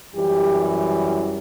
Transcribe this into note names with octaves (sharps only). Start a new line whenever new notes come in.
F#2 E3 G3 G4